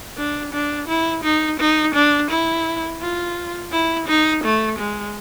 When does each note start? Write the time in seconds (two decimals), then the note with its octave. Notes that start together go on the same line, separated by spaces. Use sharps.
0.17 D4
0.53 D4
0.88 E4
1.24 D#4
1.60 D#4
1.95 D4
2.31 E4
3.01 F4
3.72 E4
4.08 D#4
4.44 A3
4.79 G#3